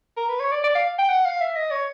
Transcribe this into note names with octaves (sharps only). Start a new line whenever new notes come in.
A#4
B4
C#5
D5
D5
F5
G5
F#5
F5
E5
D#5
C#5